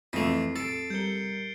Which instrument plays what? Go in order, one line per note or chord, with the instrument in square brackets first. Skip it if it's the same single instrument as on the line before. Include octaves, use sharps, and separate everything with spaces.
[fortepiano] F2 [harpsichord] E3 A3 [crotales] C7
[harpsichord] A4 [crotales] A6 C7 D7
[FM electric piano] G3 A#4 [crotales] G6 C#7 G7